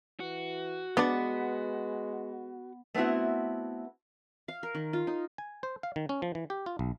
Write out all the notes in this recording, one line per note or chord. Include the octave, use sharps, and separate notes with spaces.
E3 F#4
G#3 B3 D4 D5
A3 B3 C4 E4 F#4
F5
A#4
D#3
F4
D#4
G#5
C5
F5
D#3
C#4
F3
E3
G4
F4
B1